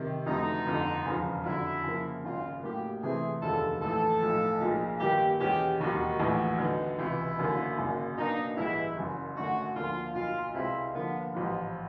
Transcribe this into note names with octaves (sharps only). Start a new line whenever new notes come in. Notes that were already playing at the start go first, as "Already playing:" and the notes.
Already playing: C3 D#3 G3
F1 F2 D3 F#3 A3 D#4
G1 F2 D3
E1 E2 C#3 F3
F2 D3 F#3 E4
C#3 F3 A#3
G#1 F#2 C#3 F4
A2 F#3 A#3 G4
C3 E3 A3 C4 E4 G#4
F1 D#2 D3 F3 G#3 A4
A#1 A2 E3 A4
B1 A2 F3
B1 A#2 F3 G#3
G2 D#3 G3 A#3 G4
E2 B2 G#3 C#4 G4
E1 D#2 D#3 F#3 F#4
A#1 A2 E3
D3 F#3 B3 D#4
C#2 C3 E3 E4
F#1 F#2 D3 F#3 A#3
G#1 F#2 C#3 F#3 A#3
B2 F#3 A#3 D4 D#4
A1 G2 E3 G#3 E4
F#1 F#2 C#3
G#1 F#2 D3 F#3 A3 F#4
D2 D3 F3 A#3 F4
B1 A#2 F#3 F4
C2 B2 G#3 C4 E4 F4
D3 F3 A#3 B3
A1 G#2 F3 B3